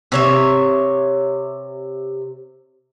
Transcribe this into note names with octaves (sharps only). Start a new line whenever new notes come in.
C3 C#5 E5